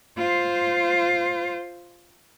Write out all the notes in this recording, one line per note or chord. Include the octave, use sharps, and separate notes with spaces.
F4 C5